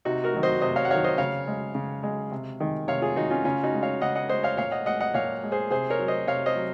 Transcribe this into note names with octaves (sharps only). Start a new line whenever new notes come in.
C3 D#4 F#4
F#4 A#4
D#3 F#3
C5 D#5
C3 C5 D#5
C#5 F5
F#5
D#3 F#3 C#5 F5
C5 D#5
C#3 C#5 F5
G#3
C#3
G#3
C3
D#3 G#3
C3 C#5 F5
F4 G#4
D#3 G#3 D#4 F#4
C#4 F4
C#3 C#4 F4
D#4 F#4
G#3
C#5 F5
C#3 D#5 F#5
D#5 F#5
G#3 C5 D#5
C#5 F5
A#2 C#5 F5
D#5 F#5
G#3 D#5 F#5
D#5 F#5
A#2 C#5 F5
G#3
G#4 C5
C3 G#4 C5
A#4 C#5
F#3
C5 D#5
C3 C#5 F5
C5 D#5
F#3